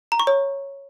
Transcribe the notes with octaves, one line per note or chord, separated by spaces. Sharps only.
A#5
C#6
C#5